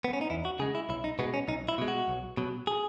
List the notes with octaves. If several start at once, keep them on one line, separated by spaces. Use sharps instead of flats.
B3
C#4
D#4
E2 E4
F#4
C#3 G#3 G#4
E4
B1 E4
D#4
B2 G#3 B3
C#4
B1 D#4
E4
B2 G#3
F#4
B1
B2 F#3
G#4